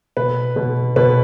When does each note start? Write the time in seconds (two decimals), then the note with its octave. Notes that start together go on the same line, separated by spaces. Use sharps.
0.17 B2 B4
0.56 B2
0.96 B2 B4